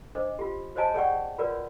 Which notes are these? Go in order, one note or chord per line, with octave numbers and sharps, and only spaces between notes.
D4 C5 D#5 D6
F4 G4
F#4 C5 C#5 D#5 G#5 A5
G#4 C#5 D5 F#5 G5 C#6
F4 F#4 A#4 B4 C#5 D5